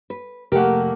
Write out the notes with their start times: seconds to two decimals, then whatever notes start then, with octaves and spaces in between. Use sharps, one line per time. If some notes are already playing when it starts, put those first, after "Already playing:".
0.10 B4
0.52 F1 A3 A#3 G4 A#4 F#5